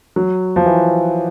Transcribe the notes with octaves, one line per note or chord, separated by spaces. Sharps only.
F#3
F3
E3